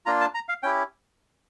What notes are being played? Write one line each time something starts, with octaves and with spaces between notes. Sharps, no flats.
A#3 D4 F4 A#5
A5
A#5
F5
C#4 E4 G4 G5